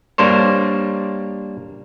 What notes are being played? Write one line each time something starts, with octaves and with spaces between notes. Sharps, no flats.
G3 A#3 D4 C5 C#5